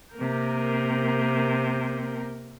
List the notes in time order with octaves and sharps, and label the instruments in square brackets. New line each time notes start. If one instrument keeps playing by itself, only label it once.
[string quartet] C3 A#3 A#4 G6